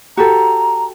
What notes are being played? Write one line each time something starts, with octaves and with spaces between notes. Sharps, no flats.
F#4 G4 A4 A#5